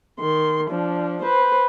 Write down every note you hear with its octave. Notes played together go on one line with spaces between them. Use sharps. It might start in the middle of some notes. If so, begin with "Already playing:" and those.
D#3 C6
F3 D4
B4 C5